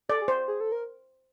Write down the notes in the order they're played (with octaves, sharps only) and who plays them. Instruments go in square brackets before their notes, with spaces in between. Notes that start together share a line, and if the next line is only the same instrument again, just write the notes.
[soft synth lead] A4 [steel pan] D5
[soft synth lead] G#4
[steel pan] C5
[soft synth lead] G#4
A4
A#4